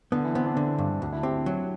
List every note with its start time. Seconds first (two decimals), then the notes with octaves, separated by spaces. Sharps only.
0.12 D3 B3
0.24 E3
0.35 B3 C4
0.46 D4
0.57 D3 D4
0.78 G2 D4
1.01 D2 D4
1.12 E4
1.23 C4 G4
1.46 F#3